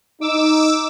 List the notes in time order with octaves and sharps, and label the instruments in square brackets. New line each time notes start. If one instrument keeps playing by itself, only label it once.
[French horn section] D#4 [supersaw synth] D6 E6